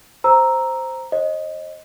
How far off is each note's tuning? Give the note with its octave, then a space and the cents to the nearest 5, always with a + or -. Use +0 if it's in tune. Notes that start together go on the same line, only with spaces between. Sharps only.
C5 +0 A#5 +0 E6 +0
C5 +45 D#5 +0